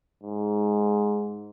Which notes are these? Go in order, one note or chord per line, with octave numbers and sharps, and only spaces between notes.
G#2